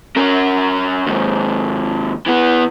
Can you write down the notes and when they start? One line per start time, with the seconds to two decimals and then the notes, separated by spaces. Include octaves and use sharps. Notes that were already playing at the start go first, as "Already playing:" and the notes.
0.17 C#4 A#4
1.06 D#2 G#2
2.27 E3 B3